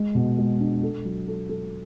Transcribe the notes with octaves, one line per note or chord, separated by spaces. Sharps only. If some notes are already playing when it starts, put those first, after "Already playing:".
Already playing: G#3
B2
G#3
D4
A4
F#3
A4
A4